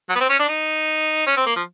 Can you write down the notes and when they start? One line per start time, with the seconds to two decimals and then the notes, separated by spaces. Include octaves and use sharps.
0.09 F#3
0.15 B3
0.20 C4
0.29 C#4
0.39 D4
0.49 D#4
1.27 C#4
1.37 C4
1.46 A#3
1.56 F3